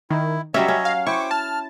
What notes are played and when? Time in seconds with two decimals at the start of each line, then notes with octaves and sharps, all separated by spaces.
0.10 D#3 E4
0.54 F#3 G3 C#4 C#5 D#5 E5
0.68 C#4
0.85 F5
1.07 E4 C5 G5 C#6 D6
1.31 A5 F6